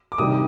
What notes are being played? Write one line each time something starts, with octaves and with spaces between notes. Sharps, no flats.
D6
C3 D#3 G3 D4 D#6